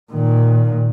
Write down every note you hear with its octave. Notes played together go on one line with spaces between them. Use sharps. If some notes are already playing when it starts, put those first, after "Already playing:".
A#2 D#3